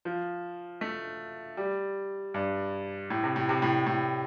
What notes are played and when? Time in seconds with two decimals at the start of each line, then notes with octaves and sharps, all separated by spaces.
0.05 F3
0.81 A3
1.57 G3
2.34 G2
3.10 A2
3.23 C3
3.36 A2
3.49 C3
3.62 A2
3.86 A2